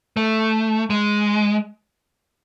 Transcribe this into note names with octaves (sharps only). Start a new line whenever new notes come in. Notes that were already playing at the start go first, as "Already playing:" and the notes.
A3
G#3